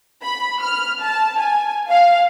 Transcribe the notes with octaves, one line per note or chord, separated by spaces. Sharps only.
B5
F6
A5
G#5
F5